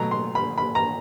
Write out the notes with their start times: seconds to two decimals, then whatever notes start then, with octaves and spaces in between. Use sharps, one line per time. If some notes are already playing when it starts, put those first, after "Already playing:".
Already playing: B2 F#3 A3 A#5
0.11 C6
0.35 B5
0.58 B5
0.75 A#5